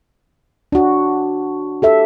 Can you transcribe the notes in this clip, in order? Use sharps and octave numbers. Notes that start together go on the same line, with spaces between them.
D4 F#4
G4 A4 E5